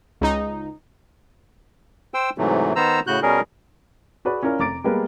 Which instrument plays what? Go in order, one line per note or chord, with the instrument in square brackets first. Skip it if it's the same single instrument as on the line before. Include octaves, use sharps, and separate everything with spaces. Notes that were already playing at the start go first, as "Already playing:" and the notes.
[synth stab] C#2 D#4
[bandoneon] C5 G5 E6
G#2 C3 E3 F#3 A3
D#3 B3 C5 A#5 E6
A2 C#3 F#4 F#6 G6
B2 G3 C#4 G#4 A#4
[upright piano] F#4 G#4 B4 D5
C#4 E4 F4 A#4 D5
F1 A#5 D6 A6 D7
G3 G#3 A#3 B3 A#4 B4